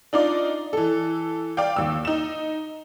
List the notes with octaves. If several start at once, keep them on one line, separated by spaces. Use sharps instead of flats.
D4 D#4 F4 D5
E3 A4
D5 F5 G5
D#2 E6
D#4 E7